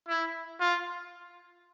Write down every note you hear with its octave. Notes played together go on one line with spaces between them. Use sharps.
E4
F4